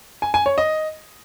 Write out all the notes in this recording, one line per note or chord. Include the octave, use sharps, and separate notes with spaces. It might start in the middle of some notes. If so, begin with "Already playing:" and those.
G#5
G#5
C#5
D#5